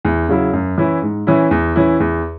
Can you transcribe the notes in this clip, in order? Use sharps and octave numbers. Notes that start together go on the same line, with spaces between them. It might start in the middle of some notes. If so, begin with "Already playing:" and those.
E2
C#3 F#3 E4
F#2
E3 C#4 E4
G#2
E3 C#4 E4
E2
E3 C#4 E4
E2